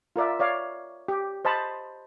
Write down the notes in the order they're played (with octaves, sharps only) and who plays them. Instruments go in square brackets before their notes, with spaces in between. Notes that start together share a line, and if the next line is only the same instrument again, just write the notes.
[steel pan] F4 A#4 D5 E5
C#5 D5 F5
G4
C5 D#5 A5 B5